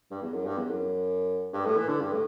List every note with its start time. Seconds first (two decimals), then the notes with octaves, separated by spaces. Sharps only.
0.11 G2
0.22 E2
0.33 F#2
0.46 G2
0.57 E2
0.70 F#2
1.53 G2
1.65 A2
1.77 E3
1.89 D3
2.01 G2
2.12 A2